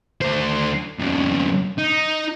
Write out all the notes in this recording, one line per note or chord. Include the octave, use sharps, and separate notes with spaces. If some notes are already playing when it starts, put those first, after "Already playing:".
D2 C5
F2 C#3
D#4